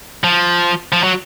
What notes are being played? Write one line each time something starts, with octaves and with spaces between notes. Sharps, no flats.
F3
F3
F#3